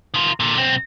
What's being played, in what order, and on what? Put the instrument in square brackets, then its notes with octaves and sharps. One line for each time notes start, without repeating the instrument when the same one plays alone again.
[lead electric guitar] D#3 F4
A#2 D3
B1 C4